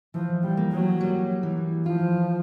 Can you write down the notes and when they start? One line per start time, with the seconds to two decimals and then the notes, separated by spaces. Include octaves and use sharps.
0.14 E3 F3
0.43 G3
0.57 A#3
0.72 F#3
1.01 G3
1.43 E3
1.86 F3 F4